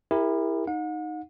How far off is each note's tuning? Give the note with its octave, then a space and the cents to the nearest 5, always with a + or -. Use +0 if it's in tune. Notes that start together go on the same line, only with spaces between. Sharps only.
E4 +0 G4 +40 A#4 +0
D#4 +0 F#5 -40